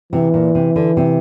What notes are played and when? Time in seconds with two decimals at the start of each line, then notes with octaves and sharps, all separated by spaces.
0.12 C3 E3
0.34 A#2
0.55 C3
0.76 D3
0.97 C3